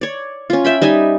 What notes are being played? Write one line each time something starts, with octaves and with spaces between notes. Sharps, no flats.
C#5 D5
C#4 F4
E5 G5 B5
G3 D#4 E5 G#5